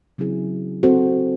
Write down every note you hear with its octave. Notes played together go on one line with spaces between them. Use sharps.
C#3 F#3 C4 E4 G#4
C4 F#4 A4 C5